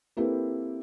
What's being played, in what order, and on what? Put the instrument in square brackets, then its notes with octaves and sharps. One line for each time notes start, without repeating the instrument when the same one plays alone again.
[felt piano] A#3 C4 E4 G4 A4 B4